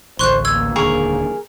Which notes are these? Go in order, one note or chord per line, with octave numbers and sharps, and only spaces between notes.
A1 D2 C5 C6 C#6 F#6
A#3 E6 G#6
D#1 C#2 D3 G#4 A#4 C#6